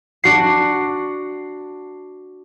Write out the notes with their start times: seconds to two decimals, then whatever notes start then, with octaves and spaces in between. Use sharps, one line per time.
0.24 D4 F#4 C7